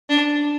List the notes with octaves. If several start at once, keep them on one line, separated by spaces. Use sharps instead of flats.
D4